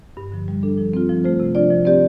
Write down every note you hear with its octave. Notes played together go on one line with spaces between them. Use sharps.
G2
D3 F3
G3
D4 A4
F3
C4 F4
F3
A3 F4 C5
C3
F3 D4 F4 D5
F3
C4 G4 D5